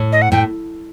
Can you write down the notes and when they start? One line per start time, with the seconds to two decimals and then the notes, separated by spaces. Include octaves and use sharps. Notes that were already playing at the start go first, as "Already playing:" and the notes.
Already playing: A2
0.12 D#5
0.22 F#5
0.32 A2 G5